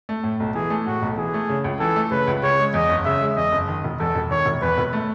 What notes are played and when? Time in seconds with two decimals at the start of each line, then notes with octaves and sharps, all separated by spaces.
0.09 A3
0.23 A2
0.40 B1
0.55 E3 G#4
0.70 A3
0.87 A2 F#4
1.02 B1
1.18 E3 G#4
1.34 A3
1.49 C#3
1.64 C#2
1.80 E3 A4
1.96 A3
2.11 C#3 B4
2.27 C#2
2.43 C#3 C#5
2.59 G#3
2.74 E2 D#5
2.89 F#1
3.05 C#3 E5
3.21 G#3
3.37 E2 D#5
3.52 F#1
3.68 D#3
3.84 E1
3.99 E2 A4
4.15 E1
4.31 D#3 C#5
4.46 E1
4.62 E2 B4
4.78 E1
4.93 A3